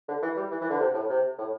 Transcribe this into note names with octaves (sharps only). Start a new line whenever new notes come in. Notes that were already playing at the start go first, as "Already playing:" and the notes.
D3
E3
G3
E3
E3
D3
C3
A2
C3
A2